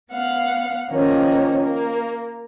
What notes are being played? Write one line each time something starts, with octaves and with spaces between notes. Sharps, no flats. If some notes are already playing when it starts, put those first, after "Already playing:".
B3 F5 F#5
D#3 F3 A#3 C#4
A#3